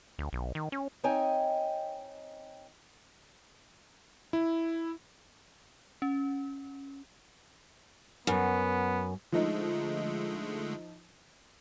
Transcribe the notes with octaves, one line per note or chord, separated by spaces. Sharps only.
D2
B1
D#3
C#4
C4 D#4 C#5 D#5 G5 G#5
E4
C#4
F#2 B3
D3 F3 G#3 A3 D#4